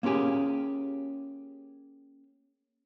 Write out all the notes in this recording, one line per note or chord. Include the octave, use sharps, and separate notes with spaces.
A#3 C#4 F4 G4 G#4